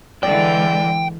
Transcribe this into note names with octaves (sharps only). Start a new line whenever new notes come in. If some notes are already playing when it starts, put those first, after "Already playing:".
D3 E3 G#3 D5 G5